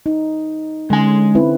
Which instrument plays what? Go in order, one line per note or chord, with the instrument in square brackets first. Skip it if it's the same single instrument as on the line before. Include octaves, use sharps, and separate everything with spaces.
[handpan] D#4
[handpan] D3 C#4 [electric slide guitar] G#3 G#5
[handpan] C4 E4 B4